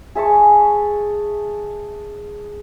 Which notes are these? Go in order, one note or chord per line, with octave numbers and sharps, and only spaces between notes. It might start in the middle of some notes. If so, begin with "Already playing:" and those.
G#4 E5 A5 C#6